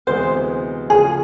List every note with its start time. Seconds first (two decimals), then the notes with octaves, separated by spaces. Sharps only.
0.07 D2 C3 E3 G#3 B3 C5
0.89 C#3 F3 A3 C#4 F#4 G#4